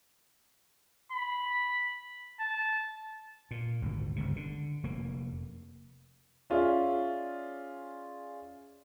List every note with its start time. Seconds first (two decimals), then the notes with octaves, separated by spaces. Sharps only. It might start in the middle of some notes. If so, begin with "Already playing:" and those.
1.12 B5
2.40 A5
3.51 A#2
3.82 G#1 D2
4.16 G1 C#2 C3
4.36 D3
4.83 F1 A#3
6.50 C#4 F4 G#4 C#5 D5 E5